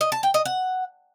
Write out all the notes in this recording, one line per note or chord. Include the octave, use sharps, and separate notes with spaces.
D#5
A5
G5
D#5
F#5